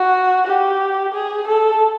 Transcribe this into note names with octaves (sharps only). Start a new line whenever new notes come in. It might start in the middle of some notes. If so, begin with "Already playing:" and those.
Already playing: F#4
G4
G#4
A4